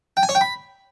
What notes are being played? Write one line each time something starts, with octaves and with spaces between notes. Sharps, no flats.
G5
G#5
C#5
G5
B5